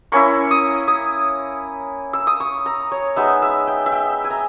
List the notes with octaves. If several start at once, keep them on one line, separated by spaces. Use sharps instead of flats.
A#3 C#4 E4 C#6
D#6
D#6
E6
D#6
C#6
A#5
C#5
G#3 B3 D#4 E5
E5
G5
E5
G5
G#5
A#5